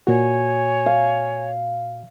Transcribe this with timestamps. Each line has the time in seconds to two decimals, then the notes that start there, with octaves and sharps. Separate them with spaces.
0.07 A#2 F#4 C#5 G#5
0.86 F5